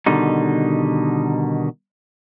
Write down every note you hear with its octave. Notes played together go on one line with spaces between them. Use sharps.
B2 D3 D#3 G3 D#4